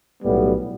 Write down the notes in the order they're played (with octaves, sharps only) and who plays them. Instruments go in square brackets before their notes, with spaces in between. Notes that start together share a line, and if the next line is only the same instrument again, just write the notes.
[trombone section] B1 A2 G3 B3